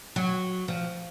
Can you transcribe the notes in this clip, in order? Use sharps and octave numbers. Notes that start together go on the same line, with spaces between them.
F#3
F3